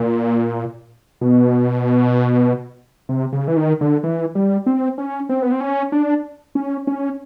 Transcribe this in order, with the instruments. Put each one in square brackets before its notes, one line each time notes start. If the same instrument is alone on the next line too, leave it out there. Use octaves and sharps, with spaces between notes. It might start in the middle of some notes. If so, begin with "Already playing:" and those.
Already playing: [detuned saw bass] A#2
B2
C3
C#3
E3
D#3
D3
E3
G3
C4
C#4
C4
B3
C4
C#4
D4
C#4
C#4